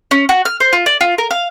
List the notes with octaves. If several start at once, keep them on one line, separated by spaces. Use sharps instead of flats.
C#4
F#4
F6
C5
F4
D5
F4
A#4
F5